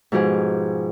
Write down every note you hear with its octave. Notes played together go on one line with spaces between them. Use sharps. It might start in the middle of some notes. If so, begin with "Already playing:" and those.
G#2 B2 F3 G4 G#4